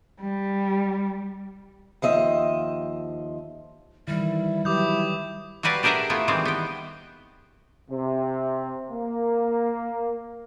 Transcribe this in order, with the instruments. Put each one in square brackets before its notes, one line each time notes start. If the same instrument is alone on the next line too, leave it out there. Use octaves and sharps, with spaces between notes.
[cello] G3
[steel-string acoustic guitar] D#2 F3 D#5 E5
[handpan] D#3 E3 [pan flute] G3 [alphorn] E4
[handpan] F#3 G4 B4 [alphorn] E4 [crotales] D6 D#6 G6
[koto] F#3 G3 F#4 B4 D5 F5
D4 G4 G#4 A#4 E5 F#5
A3 B3 E4 F4
D#3 E3 G3 G#3 C4
B3 G5
[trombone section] C3
A#3